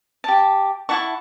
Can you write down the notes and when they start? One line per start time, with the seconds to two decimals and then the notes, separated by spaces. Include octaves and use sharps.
0.24 G4 A5
0.89 E4 F#5 A5 C#6